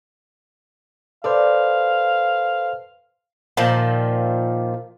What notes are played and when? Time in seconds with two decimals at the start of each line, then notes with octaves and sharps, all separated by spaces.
1.24 A4 B4 C5 D5 F5
3.57 A#2 D#3 F3